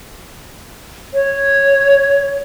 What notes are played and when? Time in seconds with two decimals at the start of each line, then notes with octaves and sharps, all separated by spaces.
1.14 C#5